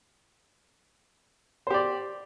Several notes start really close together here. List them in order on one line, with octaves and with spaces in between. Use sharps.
C5 G4 D5